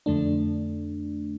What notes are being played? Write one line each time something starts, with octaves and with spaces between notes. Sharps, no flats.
F2 D3 A3 D4